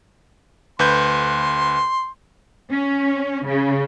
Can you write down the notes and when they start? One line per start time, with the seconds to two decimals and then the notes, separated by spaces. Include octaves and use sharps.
0.79 D2 B4 C6 G6
2.72 C#4
3.46 C#3